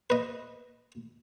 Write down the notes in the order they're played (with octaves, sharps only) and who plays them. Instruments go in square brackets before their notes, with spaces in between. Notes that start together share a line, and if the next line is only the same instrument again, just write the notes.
[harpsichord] B4 D#5